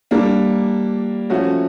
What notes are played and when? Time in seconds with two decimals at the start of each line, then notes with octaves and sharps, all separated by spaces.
0.11 G3 A#3 D4
1.30 F3 A3 C#4 F#4